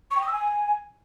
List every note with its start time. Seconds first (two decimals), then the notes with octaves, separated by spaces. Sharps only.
0.10 C#6
0.16 G5
0.21 D#6
0.26 E6
0.32 G#5